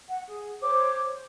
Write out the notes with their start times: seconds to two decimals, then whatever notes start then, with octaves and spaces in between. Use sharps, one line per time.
0.09 F#5
0.28 G#4
0.61 C5 C#5 D6